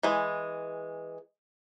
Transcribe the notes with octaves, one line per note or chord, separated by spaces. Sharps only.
E3 G#3